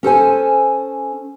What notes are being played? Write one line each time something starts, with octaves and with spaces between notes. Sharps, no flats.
C#4 A4 C5 G#5